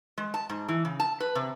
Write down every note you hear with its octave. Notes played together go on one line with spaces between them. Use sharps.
G#3
A5
G#2
E3
C#3
A5
B4
C3